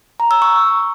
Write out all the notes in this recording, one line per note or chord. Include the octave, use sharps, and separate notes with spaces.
A#5
E6
C#6